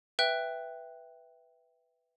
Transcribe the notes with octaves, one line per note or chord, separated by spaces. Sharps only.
B4 E5 G5 F#6